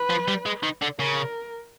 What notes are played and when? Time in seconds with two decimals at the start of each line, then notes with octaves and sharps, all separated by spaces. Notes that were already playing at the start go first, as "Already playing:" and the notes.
Already playing: B4
0.09 F3
0.28 G3
0.46 G#3
0.63 D#3
0.82 D3
1.00 C#3 A#4